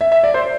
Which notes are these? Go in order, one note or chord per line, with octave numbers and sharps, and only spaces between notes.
E5
E5
D5
C5